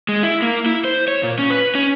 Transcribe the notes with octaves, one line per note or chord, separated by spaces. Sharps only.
G#3
E4
A#3
E4
C5
C#5
A#2
C#4
B4
C#4